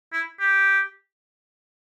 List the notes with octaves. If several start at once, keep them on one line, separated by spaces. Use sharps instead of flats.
E4
G4